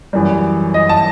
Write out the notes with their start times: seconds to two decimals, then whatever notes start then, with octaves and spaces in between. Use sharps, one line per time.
0.13 F#2 E3 G3
0.74 D#5
0.89 A5